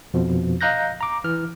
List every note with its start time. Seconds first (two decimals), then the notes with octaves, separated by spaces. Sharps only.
0.14 F2 B2 F3
0.61 D#5 F5 A#5 F#6 G6 A#6
1.01 A#5 D6
1.24 E3 F6